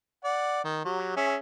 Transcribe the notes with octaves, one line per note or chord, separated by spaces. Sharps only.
D5 F#5
D#3
F#3 G4
C#4 G#4 E5